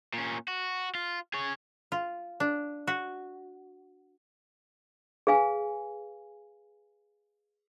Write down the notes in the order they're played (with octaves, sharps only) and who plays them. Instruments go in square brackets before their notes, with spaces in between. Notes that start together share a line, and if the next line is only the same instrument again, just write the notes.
[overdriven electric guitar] A#2 C#4
F#4
F4
G#4 C#5
[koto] F4
D4
F#4
[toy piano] G#4 B4 F5 G#5